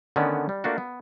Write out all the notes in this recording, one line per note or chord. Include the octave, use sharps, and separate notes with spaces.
D3 D#3 A3 B3 C#4 D5
G3
A3 A#3 D4 F4 F#4
B3